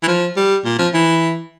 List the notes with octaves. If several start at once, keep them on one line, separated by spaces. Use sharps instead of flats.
E3
F3
G3
A#2
F3
E3